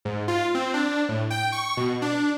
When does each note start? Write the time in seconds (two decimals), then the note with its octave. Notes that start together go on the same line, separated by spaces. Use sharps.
0.05 G#2
0.28 F4
0.55 C4
0.74 D4
1.09 A2
1.30 G5
1.52 C#6
1.77 B2
2.02 D4